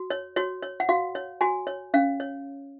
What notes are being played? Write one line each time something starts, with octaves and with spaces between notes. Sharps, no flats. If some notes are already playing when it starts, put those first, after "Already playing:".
Already playing: F#4
C#5
F#4 C#5
C#5
F#5
F#4 F5
C#5
F#4 G#5
C#5
C#4 F5
C#5